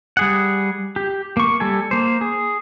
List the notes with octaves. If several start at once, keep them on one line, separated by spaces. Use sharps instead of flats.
G3 G#4 F#5
G4
A#3 C#6
G3 A4 G#5
A#3 C5
G#4